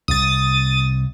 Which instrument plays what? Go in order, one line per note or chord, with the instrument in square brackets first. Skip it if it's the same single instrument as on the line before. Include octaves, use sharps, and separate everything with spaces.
[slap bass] C2 C3 [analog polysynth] D#6 A6